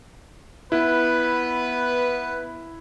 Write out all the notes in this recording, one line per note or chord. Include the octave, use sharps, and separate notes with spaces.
B3 E4 B4